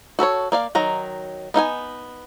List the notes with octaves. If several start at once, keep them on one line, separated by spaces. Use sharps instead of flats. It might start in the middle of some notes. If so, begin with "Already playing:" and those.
F#4 A4 B4 C#5
A#3 D5 F5
D#3 F#3 A#5
B3 D#4 F5 G#5